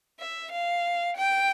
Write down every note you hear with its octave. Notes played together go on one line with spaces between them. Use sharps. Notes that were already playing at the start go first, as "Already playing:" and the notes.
E5
F5
G5